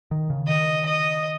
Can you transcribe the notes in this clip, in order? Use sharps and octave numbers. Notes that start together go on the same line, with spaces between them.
D#3
C#3
D#3 D#5
D#5